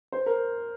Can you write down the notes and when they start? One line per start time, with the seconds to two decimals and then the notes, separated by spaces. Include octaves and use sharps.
0.12 C5
0.26 A#4